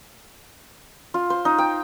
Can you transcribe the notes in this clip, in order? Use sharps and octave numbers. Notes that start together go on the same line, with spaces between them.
F4
C5
D#4
G5